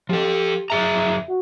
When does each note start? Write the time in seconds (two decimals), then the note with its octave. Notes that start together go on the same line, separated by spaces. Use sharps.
0.09 F3 G4 A4
0.70 F#2 G#4 E5 A#5
1.28 F#4